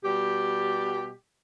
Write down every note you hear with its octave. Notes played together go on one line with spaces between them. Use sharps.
B2 G3 G4